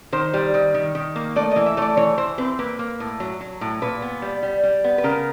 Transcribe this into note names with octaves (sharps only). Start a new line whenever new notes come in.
D#3 C5
G3
D#3
D#3
D#3
A#3
A3 D5
D#5
E3
E5
A3 C#5 D5
E3 C#5
E3 C5
C4 B4
A#3 B4
A#3
A2
F#3
F#3
A2
A#2 B4
B3
G3
G3
G3
B3
B4
C#3 A#4